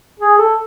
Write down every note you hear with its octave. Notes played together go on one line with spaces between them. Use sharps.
G#4
A4